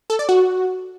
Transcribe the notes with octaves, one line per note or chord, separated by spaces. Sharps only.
A4
D5
F#4